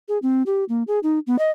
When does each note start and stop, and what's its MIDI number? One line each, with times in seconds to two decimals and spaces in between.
0.08 0.18 68
0.22 0.43 60
0.46 0.64 67
0.69 0.83 58
0.87 0.99 68
1.03 1.19 63
1.27 1.39 59
1.39 1.51 75